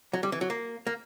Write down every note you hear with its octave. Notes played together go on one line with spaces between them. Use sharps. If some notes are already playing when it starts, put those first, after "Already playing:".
F#3
G3
E3
F#3
A#3
A#3